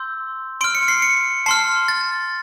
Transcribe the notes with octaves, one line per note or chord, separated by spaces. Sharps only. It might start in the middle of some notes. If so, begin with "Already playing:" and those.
Already playing: C6 E6 G6
C6 F6 D7
C#7
C7
C#7
A5 C6 F6 C7
A6